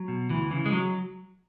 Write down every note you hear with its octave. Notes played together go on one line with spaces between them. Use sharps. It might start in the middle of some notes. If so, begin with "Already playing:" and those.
Already playing: F#3
B2
D2 E3
C#3 E3
G#3
F#3